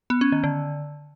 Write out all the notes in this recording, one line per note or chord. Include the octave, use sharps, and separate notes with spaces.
B3
C#4
D#3
D3